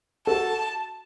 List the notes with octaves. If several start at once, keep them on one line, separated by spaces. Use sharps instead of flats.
F#4 A4 A5